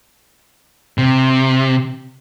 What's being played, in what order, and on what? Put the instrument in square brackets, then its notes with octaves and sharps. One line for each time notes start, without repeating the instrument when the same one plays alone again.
[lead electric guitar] C3